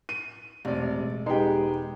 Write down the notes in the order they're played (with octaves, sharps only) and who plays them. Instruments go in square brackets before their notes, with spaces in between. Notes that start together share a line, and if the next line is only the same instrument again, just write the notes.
[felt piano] D#7
[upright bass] E1 [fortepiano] A1 C3 D5
[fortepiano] G#3 B3 G5 [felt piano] D#4 G4